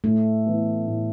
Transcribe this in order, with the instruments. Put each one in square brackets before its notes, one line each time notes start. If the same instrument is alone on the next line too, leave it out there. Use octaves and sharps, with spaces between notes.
[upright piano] A2 [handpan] A3
[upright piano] E3 B3
A2